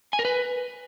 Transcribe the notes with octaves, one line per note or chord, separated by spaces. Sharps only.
G#5
A#4
B4